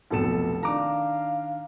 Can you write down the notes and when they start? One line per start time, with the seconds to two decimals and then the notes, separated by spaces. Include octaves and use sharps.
0.11 F1 B1 C3 F3 A4 E7
0.63 D#3 D4 F5 A#5 D6